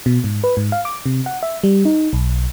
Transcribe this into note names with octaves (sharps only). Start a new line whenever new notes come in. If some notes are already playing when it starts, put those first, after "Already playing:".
B2
G#2
B4
G#2
F5
D6
C3
F#5
E5
G3
D#4
B1